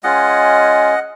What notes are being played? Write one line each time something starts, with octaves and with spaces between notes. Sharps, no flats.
G#3 C#4 F4 D#5 F#5